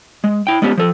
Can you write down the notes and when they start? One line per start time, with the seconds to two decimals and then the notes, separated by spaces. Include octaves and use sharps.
0.24 G#3
0.47 E4 G5
0.62 G#3 B3 C#4 G4
0.77 F3 A4